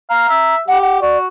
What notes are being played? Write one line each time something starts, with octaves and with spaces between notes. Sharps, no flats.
F5 A#5
E5
G4 F#5
F#5
F#4 D5